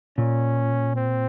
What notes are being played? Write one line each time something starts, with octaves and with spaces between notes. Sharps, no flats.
A#2 C#4
C4